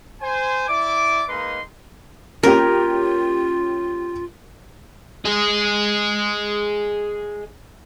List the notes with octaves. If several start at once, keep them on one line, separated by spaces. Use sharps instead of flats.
C5 G#5
E4 D5 D6
G#3 A#3 D#4 B4 C6
A#3 C#4 F4 G4 A#4
G#4 D#5